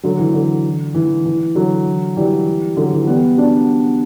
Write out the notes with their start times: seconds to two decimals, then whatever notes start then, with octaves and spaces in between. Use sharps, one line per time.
0.03 D3 F#3
0.19 E3
0.34 D3
0.94 E3
1.25 E3
1.55 D3 F#3
2.17 E3 G3
2.77 D3 F#3
2.93 E3
3.07 G3 B3
3.37 D4 F#4